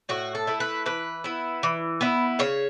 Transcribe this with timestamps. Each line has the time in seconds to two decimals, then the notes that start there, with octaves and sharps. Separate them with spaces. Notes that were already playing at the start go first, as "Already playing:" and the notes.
0.09 A2 F#4
0.35 A4
0.47 A3 E4
0.60 B4
0.86 E3 B4
1.24 B3 E4
1.63 E3
2.01 B3 E4
2.39 C#3 C#5